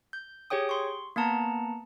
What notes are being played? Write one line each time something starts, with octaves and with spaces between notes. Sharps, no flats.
G6
G4 G#4 C#5 G5 D#6
C6 C#6
A#3 B3 F#5 A5 A#5